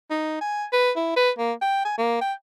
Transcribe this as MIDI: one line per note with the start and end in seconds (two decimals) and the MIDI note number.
0.10 0.36 63
0.41 0.65 80
0.72 0.91 71
0.96 1.12 64
1.16 1.31 71
1.39 1.53 58
1.61 1.84 79
1.85 1.97 80
1.98 2.21 58
2.21 2.33 79